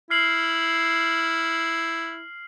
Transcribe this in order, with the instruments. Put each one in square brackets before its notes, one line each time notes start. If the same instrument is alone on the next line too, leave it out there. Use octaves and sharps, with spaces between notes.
[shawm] E4 [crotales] F6 C7 F#7